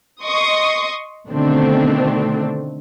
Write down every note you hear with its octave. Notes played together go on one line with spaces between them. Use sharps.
D#5 C6 C#6 D#6
B2 D3 D#3 A3 C4 D4